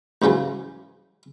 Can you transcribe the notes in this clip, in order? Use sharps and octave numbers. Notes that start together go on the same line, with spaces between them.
A1 G#2 C#3 E3 F#3